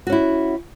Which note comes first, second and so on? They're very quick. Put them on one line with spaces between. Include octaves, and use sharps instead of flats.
F#4 C#4 E4